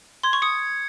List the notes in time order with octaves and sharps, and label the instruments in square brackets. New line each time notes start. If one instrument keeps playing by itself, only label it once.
[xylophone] C6 [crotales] G#6
[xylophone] C#6
[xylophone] D#6 [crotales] C#7